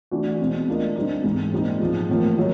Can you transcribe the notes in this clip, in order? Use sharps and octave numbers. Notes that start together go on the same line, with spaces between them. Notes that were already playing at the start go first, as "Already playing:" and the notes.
E3 A3 D4 F#4
B2 G#3 C4
A3 D4 F4 A#4 D#5
G2 D3 G3 C4 D#4
G#2 E3 G#3
A#2 G3 C4 D#4
G#2 F3 G#3
A2 F3 A#3
D#3 F#3